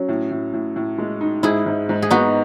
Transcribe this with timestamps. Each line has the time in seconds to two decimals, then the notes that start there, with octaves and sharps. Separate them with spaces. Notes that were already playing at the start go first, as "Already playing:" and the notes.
Already playing: F#3 C#4
0.09 A2
0.31 A2
0.53 A2
0.76 A2
0.98 G#3
1.21 D#4
1.43 G#2 E4 G#4
1.66 G#2
1.89 G#2
2.02 G#4
2.10 B3 D#4 F#4